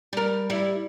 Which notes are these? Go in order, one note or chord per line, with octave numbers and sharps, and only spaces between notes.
G3 A#4
G3 E4